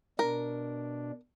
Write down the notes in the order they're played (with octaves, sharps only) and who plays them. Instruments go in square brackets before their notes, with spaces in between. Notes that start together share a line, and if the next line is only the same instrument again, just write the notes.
[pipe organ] B2 D4 [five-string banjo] A#4